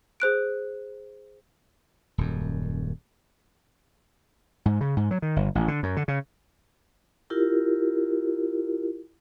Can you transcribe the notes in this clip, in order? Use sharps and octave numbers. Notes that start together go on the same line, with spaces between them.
G#4 C5 F#6 D7
D#1 F#2
G#2
C#3
G#2
F#3
D#3
G1
A1
D3
F#2
D3
C#3
E4 F4 G4 A#4